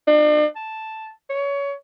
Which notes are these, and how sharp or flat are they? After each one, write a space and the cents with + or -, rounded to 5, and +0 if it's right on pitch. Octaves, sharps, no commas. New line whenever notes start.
D4 +40
A5 +0
C#5 +20